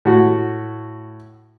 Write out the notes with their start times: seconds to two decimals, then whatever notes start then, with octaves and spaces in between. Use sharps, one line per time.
0.05 A2 F#4